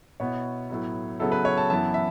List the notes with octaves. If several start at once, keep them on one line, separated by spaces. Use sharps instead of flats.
B2 B3 E4 C#5
A2 F#3 B3 E4
C#3 F#3 B3 E4 A4
B4
C#5
A5
F#2 E3 B3 E4 A5
E5